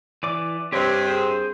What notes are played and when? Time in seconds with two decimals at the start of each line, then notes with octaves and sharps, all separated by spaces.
0.23 E3 D5 D6
0.73 G2 C4 G4 C#5 D#5
1.07 G#4 A#4 C5